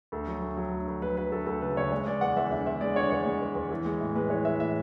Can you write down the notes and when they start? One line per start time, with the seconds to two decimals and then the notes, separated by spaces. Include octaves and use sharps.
0.12 D2 A4
0.27 F#3
0.42 D2
0.57 F#3
0.72 D2
0.88 D2
1.02 F#3 B4
1.17 F#3 B4
1.32 D2 A4
1.47 D2 A4
1.61 C#3 B4
1.77 C#3 C#5
1.92 G#3 C#5
2.07 G#3 D5
2.21 E2 F#5
2.37 E2 E5
2.51 D3 E5
2.66 E2 E5
2.81 G#3 D5
2.96 D3 C#5
3.10 E2 C#5
3.26 G#3
3.41 E2
3.55 E2
3.71 E3
3.85 G#3
4.01 A2
4.15 G#3 B4
4.30 E3 C#5
4.45 E3 E5
4.60 A2 E5